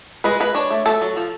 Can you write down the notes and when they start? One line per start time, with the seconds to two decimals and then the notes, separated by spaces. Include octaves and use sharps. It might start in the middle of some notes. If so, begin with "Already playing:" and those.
0.24 G#3 B4
0.40 G#3 B4
0.55 D4 C#5
0.70 A3
0.85 A3 A4
1.01 F#3
1.17 F3